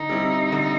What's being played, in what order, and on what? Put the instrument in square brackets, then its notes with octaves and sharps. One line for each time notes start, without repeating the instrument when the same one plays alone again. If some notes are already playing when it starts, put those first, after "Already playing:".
Already playing: [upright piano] D3 [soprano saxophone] D#4
[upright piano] G3 C4 E4
D3